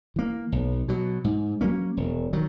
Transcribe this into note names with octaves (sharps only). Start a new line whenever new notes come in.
E3 A#3
B1
B2 F#3
G#2
F#3 A#3 C#4
E1
D#3 F#3